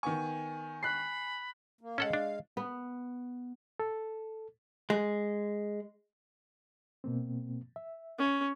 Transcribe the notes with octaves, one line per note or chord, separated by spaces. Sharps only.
D#3 B3 G#5 C#6
B5 F#6 C7
A#3
G#3 C#4 A4 F5 F#5
D4
B3
A4
G#3
B2 A#3 C4
E5
C#4